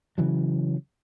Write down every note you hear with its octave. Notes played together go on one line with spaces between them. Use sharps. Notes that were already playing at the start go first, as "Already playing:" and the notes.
C#3 E3 F#3